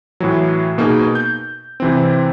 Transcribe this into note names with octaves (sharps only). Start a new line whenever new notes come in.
A2 E3 F#3
B2 A#3 B3 D#4 G#4
G6
C3 E3 C4